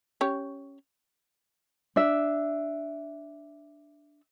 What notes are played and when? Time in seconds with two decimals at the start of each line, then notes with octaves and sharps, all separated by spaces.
0.21 C#4 G4 C#5
1.96 D4 E5